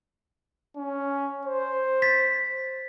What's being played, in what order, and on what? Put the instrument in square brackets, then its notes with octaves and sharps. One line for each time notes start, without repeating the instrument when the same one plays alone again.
[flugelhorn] C#4
C5
[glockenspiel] A6 B6